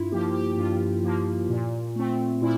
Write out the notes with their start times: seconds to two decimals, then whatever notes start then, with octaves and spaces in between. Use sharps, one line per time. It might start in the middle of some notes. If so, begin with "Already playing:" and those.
Already playing: G2 E4 F4
0.12 F3 A#3 G4
0.35 G4
0.57 G2 F4
1.03 F3 A#3
1.49 A#2
1.96 A3 C4
2.41 A#2 E4